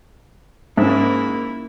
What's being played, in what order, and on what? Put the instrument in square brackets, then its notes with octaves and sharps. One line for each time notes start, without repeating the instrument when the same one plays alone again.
[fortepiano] G#2 [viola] A#3 E4 [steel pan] C#4 E5